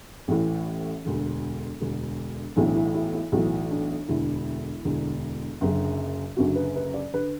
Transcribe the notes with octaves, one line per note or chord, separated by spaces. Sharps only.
A1 A2 E3
E1 D2 D3
E1 D2 D3
B1 A2 E3 D4
E4
E4
E4
B1 A2 E3 F#4
D4
E1 D2 D3 E4
E1 D2 D3
F#1 F#2 D3
F#1 F#2 D3 F#4
B4
B4
D5
D3 B4